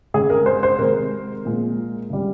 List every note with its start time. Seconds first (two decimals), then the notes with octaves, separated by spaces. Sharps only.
0.14 C#3 G#3 G#4
0.30 A#4
0.46 C5
0.63 C5
0.79 C3 D#3 G#3 A#4
1.45 A#2 F3 G#3
2.10 C#3 G3